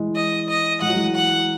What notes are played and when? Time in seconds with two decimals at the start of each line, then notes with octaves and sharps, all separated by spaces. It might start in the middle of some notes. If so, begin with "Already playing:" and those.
Already playing: E3 G#3
0.15 D#5
0.49 D#5
0.82 G#3 F#5
0.89 F#3
0.96 E3 G#3
1.15 F#5